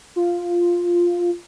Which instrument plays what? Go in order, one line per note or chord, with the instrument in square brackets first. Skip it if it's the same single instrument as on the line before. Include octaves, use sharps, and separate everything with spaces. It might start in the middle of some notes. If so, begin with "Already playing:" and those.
[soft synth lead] F4